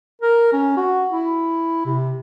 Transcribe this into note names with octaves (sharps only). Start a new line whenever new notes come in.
A#4
C#4
F#4
E4
C3